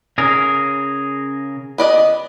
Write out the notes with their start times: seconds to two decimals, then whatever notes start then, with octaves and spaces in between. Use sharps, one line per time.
0.18 C#3 G#4 A#4
1.78 B3 D5 D#5